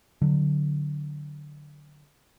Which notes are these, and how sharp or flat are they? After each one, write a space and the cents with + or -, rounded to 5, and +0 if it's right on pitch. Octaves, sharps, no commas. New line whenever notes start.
D3 +10 F#3 +0